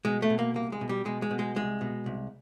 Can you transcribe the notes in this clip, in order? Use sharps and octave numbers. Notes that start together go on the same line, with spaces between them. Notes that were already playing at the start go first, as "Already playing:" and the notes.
B2 G#3
A3
B2
A#3
C2 A#3
G#3
B2
G3
B2 G#3
G#3
B2
G#3
C2 G#3
B2
C2